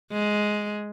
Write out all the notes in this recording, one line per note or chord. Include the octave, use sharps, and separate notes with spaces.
G#3